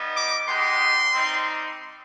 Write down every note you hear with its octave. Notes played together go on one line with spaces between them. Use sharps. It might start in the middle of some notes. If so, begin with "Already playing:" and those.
Already playing: G3 B3 D#4
D6
G#3 B3 D#4 G4 C6
G3 C4 D#4